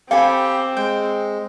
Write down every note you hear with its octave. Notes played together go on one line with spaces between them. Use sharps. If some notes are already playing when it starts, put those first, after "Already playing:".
C4 G4 A4 F5 G#5 B5
G#3 G5